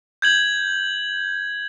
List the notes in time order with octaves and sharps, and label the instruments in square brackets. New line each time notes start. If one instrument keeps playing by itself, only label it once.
[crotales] G6 G#6 F#7